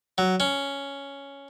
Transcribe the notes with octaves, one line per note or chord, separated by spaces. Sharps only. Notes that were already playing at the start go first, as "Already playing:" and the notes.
F#3
C#4